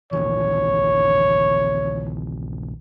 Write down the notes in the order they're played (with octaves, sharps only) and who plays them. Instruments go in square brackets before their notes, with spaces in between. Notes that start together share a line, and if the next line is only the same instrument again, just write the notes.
[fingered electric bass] A#1 D#2 E3 [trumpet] C#5